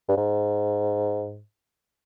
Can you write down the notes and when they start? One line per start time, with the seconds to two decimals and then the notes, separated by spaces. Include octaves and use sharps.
0.08 G2
0.17 G#2